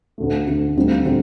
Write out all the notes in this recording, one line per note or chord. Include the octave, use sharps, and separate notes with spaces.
D2 D3 A3
D2 D3 A3
D2 D3 G3 C4 D#4
D3 G3 C4 D#4